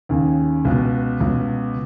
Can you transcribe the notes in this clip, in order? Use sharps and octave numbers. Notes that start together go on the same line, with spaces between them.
D#2 C#3
C#2 B2
C#2 B2